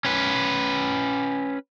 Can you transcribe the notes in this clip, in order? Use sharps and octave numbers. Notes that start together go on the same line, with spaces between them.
C#4 B4